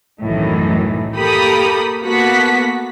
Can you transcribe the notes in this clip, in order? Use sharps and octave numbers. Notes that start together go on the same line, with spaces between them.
C2 F#2 A2 D#3 E3
A#3 G4 A4 A#4 B5 D#6
A#3 B3 F#4 A4 F#5 B6